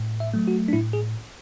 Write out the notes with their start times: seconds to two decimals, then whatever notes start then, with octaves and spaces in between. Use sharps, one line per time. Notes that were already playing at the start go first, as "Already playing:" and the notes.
Already playing: A2
0.20 E5
0.34 F#3 A3
0.48 F#4
0.68 D4
0.73 A2 E4
0.93 G#4